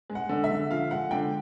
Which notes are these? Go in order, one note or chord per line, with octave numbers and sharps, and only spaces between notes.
G#3
F#5
D3
E5
D3
F3 F5
G#3 F#5
D3 G5